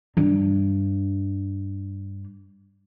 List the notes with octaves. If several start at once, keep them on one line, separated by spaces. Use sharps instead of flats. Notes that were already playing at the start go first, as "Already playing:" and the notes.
G2 D4